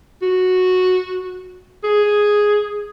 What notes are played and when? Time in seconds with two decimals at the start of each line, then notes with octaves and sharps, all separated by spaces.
0.22 F#4
1.84 G#4